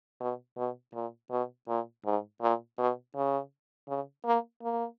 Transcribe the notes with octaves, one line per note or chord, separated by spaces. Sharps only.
B2
B2
A#2
B2
A#2
G#2
A#2
B2
C#3
C#3
A#3
A#3